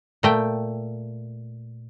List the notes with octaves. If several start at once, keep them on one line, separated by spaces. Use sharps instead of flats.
A#2 A3 G5